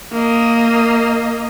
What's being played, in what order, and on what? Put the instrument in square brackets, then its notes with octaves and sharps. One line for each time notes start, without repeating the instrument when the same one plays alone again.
[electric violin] A#3 D#5